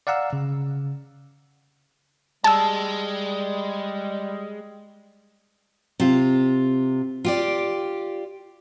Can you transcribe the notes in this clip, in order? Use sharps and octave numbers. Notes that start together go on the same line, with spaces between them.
D5 F5 F#5 A#5 E6
C#3
G3 G#3 A5 E6
C3 F4
F4 G4 D5